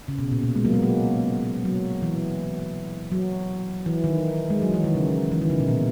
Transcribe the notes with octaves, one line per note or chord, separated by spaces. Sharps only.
C#3
B2
A#2
B2
G#3
F#3 A#3
G#3 B3
F#3 A#3
F#3
E3
F#3
E3
D#3
G#3
F#3
E3
D#3
C#3
E3
D#3
C#3
B2
A#2